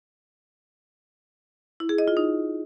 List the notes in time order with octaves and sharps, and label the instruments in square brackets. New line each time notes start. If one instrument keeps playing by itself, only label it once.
[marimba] E4
G#4
D#5
F4
D#4